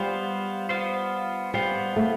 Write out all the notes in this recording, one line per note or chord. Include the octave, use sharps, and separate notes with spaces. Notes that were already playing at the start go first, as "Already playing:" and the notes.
Already playing: G3 B3 F4 C5
B3 F4 C5
G3 B3 F4 C5
A3